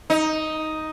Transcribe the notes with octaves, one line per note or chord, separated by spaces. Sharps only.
D#4